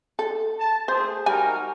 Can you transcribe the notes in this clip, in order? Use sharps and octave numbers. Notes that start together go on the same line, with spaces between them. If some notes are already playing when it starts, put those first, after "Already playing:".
A4
A5
A3 G#4 C5
G3 D#4 F#4 A#4 G#5